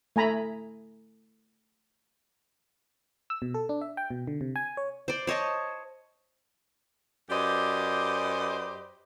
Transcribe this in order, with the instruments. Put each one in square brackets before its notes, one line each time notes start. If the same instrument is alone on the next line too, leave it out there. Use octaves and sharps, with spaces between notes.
[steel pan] A3 G#5 A#5 B5
[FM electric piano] E6
B2
A4
D4
E5
G5
B2
D3
C3
G#5
C#5
[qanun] C5 D5
C5 C#5 D#5 A5
[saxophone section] F#2 G4 B4 C5 D5 D#5